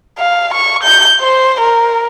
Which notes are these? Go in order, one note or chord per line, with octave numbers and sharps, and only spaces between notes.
F5
C#6
G6
C5
A#4